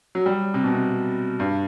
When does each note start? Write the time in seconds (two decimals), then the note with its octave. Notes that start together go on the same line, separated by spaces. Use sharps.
0.15 F#3
0.26 G3
0.54 C3
0.64 B2
0.74 C3
1.40 G2